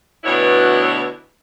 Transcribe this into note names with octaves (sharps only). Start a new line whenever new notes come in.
D2 B2 B3 D4 E4 C#5